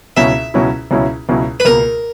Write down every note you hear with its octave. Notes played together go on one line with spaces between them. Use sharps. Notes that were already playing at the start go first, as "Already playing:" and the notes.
C#2 B2 F#3 C#4 E4 E5
C#2 B2 F#3 C#4 E4
C#2 B2 F#3 C#4 E4
C#2 B2 F#3 C#4 E4
B4
C#2 B2 A#3 A#4